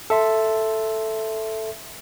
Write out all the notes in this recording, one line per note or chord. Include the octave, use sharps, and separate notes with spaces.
A4 E5 C6